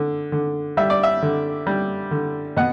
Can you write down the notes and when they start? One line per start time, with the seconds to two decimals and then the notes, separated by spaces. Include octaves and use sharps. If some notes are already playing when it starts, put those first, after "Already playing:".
Already playing: D3
0.32 D3
0.77 G3 E5
0.90 D5
1.03 E5
1.22 D3
1.67 G3
2.11 D3
2.57 B2 F#5